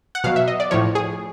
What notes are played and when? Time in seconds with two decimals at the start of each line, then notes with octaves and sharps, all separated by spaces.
0.15 F#5
0.24 B2 F#3 F5
0.36 E5
0.48 D#5
0.60 D5
0.71 A2 F3 C#5
0.95 G#4